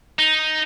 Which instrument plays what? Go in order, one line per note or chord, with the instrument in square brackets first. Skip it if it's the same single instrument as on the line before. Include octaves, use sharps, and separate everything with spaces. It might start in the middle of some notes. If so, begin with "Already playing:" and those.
[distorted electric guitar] D#4